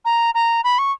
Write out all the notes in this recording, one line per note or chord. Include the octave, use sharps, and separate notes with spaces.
A#5
A#5
B5
C#6